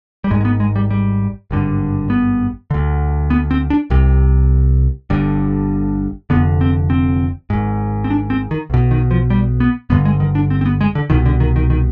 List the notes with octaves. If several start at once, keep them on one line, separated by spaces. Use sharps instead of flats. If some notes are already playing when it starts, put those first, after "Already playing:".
G3
G#1 G#2 G#3
G#3
B3
G#3
G3
G3
G#1 G2 D3
B3
D2 D3
B3
C4
D4
C2 C3
G1 G2 D3
F1 F2 D3 B3
C4
C4
G#1 G#2
C4
D4
C4
D#3
B1 B2
D#3
F3
G3
B3
G1 G2 D3 B3
G#3
D#3
D4
C4
C4
B3
G#3
D3
C2 B2 D#3
D3
D#3
D#3
D#3